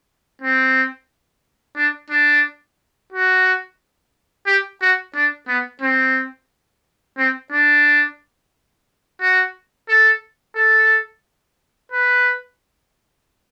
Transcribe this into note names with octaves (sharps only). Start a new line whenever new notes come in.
C4
D4
D4
F#4
G4
F#4
D4
B3
C4
C4
D4
F#4
A4
A4
B4